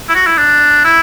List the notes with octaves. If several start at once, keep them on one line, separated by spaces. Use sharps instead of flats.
E4
F#4
E4
D4
E4